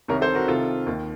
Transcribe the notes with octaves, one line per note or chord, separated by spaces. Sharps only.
C2 C3 D#3 A#4 C#5
A4 C5
F#4 A#4
C2 C3 D#3 F4 A4
D#2 D#3